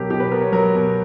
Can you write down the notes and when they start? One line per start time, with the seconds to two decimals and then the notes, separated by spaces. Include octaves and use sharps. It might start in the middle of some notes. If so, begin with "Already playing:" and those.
Already playing: B2 F#3 G4 A#4
0.10 B2 G4
0.20 B4
0.31 B3 A#4
0.41 C#5
0.52 F#3 A#4
0.75 B2